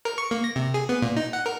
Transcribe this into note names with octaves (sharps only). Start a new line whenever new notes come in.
A#4
C#6
A#3
A#6
C3
G#4
B3
A#2
D#4
F#5
A#4